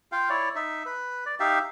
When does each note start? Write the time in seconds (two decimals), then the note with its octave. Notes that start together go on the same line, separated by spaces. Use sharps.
0.12 F4 F5 G5
0.30 E4 C#5 D5
0.55 D#4 E5
0.86 B4
1.26 D5
1.40 D#4 G4 E5 F5